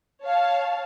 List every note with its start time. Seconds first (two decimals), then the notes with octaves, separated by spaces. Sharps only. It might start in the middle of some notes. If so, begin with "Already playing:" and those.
0.23 C#5 F5 A5